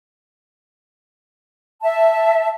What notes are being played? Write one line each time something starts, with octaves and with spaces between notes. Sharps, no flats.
E5 A5